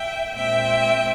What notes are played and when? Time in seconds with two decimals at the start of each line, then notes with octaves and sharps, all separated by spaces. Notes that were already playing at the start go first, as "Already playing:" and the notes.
Already playing: E5 G5
0.34 A#2 G#3 C4 E5 G5